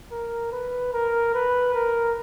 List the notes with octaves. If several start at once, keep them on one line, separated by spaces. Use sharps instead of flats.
A#4
B4
A#4
B4
A#4